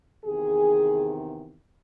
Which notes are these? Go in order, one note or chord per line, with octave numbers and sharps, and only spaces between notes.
E2 C3 D#3 G#4